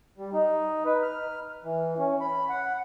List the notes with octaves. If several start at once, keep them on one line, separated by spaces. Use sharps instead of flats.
G3
D#4
B4
F6
E3
C#4
B5
F#5